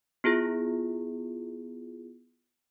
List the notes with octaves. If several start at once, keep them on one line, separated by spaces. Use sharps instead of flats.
B3 E4 F4 G#4